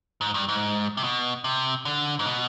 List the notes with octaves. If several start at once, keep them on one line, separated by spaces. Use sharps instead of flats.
G#2
G2
G#2
C3
B2
C3
D3
G#2
B2